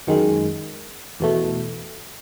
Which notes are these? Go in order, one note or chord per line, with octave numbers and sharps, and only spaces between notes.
F#2 D#3 G#3
E2 B2 A3